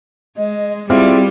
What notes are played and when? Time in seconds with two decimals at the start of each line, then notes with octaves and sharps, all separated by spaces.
0.38 G#3 D#5
0.90 G3 C4 E4 F4 G#4 D5